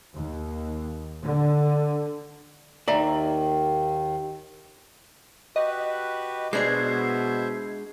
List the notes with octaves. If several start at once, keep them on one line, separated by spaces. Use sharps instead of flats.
D#2
D3
D#2 D#3 D5 E5 A#5
F#4 G4 B4 D#5
B2 G#3 D4 C5 E5 G#6 C7